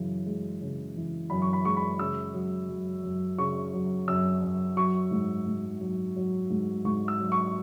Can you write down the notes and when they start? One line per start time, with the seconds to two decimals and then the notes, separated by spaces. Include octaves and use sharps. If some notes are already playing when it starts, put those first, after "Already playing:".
Already playing: F#2 C#3 E3
0.26 G#3
0.62 C#3
0.96 E3
1.30 F#2 B5
1.42 C#6
1.53 B5
1.65 G#3 C#6
1.77 B5
1.99 C#3 E6
2.34 F#3
2.69 F#2
3.03 F#2
3.38 C#3 C#6
3.73 F#3
4.08 F#2 E6
4.42 F#2
4.76 F#3 C#6
5.11 G#2
5.47 G#2
5.81 F#3
6.16 F#3
6.50 G#2
6.85 G#2 C#6
7.08 E6
7.20 F#3
7.32 C#6